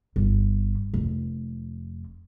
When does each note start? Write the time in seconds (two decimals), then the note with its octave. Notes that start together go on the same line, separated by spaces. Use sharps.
0.16 G1
0.94 F1